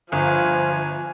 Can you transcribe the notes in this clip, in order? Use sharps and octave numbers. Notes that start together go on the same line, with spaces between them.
G1 F3 G#5